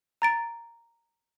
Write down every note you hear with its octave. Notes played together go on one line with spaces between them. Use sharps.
A#5 A6 D7